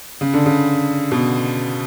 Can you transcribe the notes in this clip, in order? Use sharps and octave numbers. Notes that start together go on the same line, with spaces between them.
C#3
D3
C#3
B2